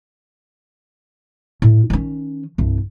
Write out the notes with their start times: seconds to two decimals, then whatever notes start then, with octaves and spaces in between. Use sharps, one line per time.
1.62 A2
1.90 D#3 C#4
2.58 C2 G2